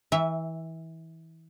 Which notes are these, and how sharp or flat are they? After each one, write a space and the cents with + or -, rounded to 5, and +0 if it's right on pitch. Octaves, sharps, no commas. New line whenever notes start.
E3 -25 E5 +0